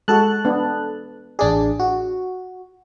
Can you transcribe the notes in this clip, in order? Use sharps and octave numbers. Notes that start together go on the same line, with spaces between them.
G#3 F#4 A4 A5 F#6
B3 D4
A1 D4 G#4 D5
F#4